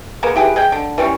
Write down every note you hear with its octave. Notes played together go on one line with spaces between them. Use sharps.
G#3 A#3 B3
E4 G4 G#4 B4
G#4 D#5 G5
D3
E3 G3 C4 C#4